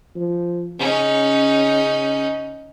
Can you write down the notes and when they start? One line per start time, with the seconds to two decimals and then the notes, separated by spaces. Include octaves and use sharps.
0.15 F3
0.80 C#3 C#4 D#4